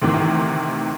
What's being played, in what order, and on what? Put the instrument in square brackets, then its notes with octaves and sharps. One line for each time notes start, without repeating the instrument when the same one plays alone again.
[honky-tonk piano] D2 C3 D#3 E3